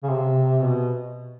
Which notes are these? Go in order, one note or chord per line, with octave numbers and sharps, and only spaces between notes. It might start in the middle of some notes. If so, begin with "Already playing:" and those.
C#3
C3
B2